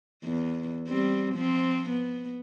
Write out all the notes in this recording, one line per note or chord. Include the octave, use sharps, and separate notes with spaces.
E2
G3 C4
F3 C4
B3